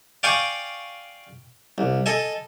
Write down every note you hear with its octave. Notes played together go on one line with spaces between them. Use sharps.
D5 F5 G5 G#5 C#6 D#6
C2
A4 D#5 G#5